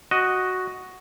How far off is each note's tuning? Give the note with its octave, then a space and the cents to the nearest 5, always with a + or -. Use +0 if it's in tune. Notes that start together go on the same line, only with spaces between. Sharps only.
F#4 +0 D#5 +0